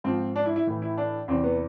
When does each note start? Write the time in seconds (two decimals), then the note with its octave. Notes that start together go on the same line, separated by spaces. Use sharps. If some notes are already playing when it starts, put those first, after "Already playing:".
0.04 G#2 F3 C4
0.36 D4
0.46 E4
0.56 E4
0.67 A2 E3
0.82 E4
0.98 D4
1.28 E2 C3 E3 C4
1.44 B3